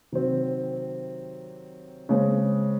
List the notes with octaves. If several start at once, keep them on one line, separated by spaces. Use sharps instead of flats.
C3 D#3 F#3 C4
C#3 G#3 C4